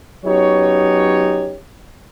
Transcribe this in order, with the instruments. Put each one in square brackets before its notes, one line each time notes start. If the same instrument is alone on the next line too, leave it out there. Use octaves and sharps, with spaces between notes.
[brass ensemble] F#3 B3 C#4 D#4 G4 C#5